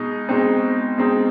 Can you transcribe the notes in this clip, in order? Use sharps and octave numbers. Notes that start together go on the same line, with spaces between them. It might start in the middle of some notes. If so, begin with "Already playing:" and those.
Already playing: B2 G#3 D#4
B2 G#3 C4 D#4
B2 G#3 C4 D#4